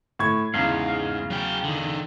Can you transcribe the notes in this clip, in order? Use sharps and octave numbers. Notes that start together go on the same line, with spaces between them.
A2 C#6 G#6
E2 G#2 C#3 F5
F#3 G5
D3 D#3